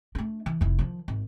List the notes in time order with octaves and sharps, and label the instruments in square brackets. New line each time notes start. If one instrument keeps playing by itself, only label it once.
[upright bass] A3 D4
E3
F1 E4
D#3 F3
G#1